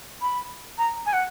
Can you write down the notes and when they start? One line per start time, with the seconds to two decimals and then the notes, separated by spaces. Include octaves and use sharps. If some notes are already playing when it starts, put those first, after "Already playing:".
0.22 B5
0.78 A#5
1.06 G#5
1.13 F#5